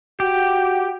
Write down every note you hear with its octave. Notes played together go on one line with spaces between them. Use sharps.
F#4 G4